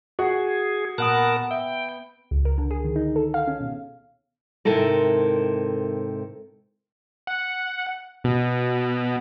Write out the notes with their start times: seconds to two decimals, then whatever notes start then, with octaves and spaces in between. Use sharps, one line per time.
0.19 F#4 G#4
0.98 A#2 B3 A#4 B4 F#5 A5 D#6 F#6
1.51 E5 G5
2.31 C#2
2.45 A#4
2.58 D3
2.71 G#4
2.84 D#3
2.96 D#4
3.16 A4
3.34 F5
3.48 C#4
3.61 B2
4.65 G#2 C3 D#3 E4 A4 A#4
7.27 F#5
8.24 B2